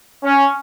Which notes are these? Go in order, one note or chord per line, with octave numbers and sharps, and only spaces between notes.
C#4